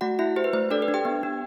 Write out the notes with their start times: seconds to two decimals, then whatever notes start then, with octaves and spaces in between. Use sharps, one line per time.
0.01 A3 F#4 F#5
0.19 E4 F#4 E5
0.36 G4 C5
0.44 B4
0.53 A3 C5
0.71 D4 A4 D5
0.82 B4
0.88 D4
0.94 G4 G5
1.05 B3
1.23 D4